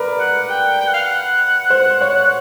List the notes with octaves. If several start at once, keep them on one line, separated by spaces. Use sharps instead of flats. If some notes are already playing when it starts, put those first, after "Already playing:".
Already playing: A#4 B4 D5
F#5
G5
G5
F#5
F5
F#5
C5
C#5